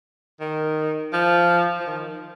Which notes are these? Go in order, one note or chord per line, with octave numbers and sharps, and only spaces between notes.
D#3
F3
F3
D#3